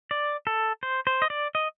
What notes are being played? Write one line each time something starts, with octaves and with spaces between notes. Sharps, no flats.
D5
A4
C5
C5
D#5
D5
D#5